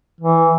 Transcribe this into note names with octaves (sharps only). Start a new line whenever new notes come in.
E3